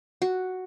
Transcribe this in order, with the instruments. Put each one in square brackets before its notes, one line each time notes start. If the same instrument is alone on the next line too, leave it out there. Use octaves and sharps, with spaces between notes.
[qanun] F#4